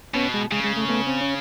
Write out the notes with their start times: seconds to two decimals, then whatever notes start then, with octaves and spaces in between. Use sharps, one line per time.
0.15 B2 B3 C#4
0.34 G#3
0.52 C#3 G#3
0.64 G#3
0.76 A3
0.89 A3 B3
1.07 C4
1.21 C#4